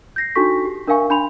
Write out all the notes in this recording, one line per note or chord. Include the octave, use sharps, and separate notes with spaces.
G6 A#6 C7
D4 D#4 F#4 A4 C#6 B6
G4
D4 A#4 E5 F5 G#5 C#6
D4 G#5 B5 C6 F7